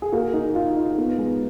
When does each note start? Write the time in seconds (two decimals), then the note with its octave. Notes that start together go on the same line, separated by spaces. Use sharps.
0.02 G#4
0.12 A#3 F#4
0.34 D#4
0.55 D#4 F4
0.77 D#4
0.98 B3
1.18 G#3